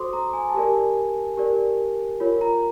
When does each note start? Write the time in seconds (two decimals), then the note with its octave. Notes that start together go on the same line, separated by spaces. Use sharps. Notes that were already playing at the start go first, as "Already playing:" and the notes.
Already playing: F#4 A4 C5 C6 D6 D#6
0.13 A#5
0.33 G#5
0.49 A5
0.54 G4 A#4 D5 G#5
1.37 G4 A#4 D5
2.20 F4 A#4 C#5
2.41 A#5